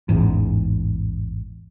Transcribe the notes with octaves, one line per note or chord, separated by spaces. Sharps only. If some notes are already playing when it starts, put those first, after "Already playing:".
A1 E2 G#2